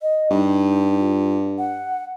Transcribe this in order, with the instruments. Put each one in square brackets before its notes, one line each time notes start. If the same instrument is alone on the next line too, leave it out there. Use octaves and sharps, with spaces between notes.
[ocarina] D#5
[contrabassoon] G2 [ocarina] D#4
[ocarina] F4
F#5